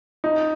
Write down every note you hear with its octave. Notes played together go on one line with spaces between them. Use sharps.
D#4